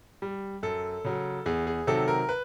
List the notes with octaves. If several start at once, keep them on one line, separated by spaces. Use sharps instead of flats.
G3
F#2 A4
C#3 F#3
E2 G#4
G#4
C3 D#3 F#3 A4
A#4
B4